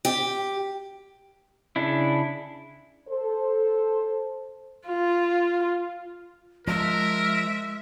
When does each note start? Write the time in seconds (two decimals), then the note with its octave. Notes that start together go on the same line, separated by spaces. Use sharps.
0.05 G4
1.76 C#3 D4 E4
3.08 A4 C5
4.88 F4
6.67 F3 G#3 A#4 E5